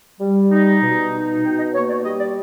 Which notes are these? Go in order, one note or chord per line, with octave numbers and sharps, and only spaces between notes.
G3
D#4
B2
D#4
B2 G5
D#5
A#3 C#5
D5
G3 D#5
D5